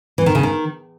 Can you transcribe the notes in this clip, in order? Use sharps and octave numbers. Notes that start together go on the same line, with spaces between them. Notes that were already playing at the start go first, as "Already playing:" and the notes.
E3
D#3
C#3
D#3